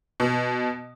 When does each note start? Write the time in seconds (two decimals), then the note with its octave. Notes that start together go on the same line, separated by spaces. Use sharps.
0.20 B2